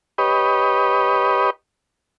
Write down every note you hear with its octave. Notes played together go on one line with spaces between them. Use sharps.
G4 B4 C#5 D#5